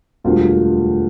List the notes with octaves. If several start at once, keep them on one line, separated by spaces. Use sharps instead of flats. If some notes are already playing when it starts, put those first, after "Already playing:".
E1 D2 D3 G3 A#3 F4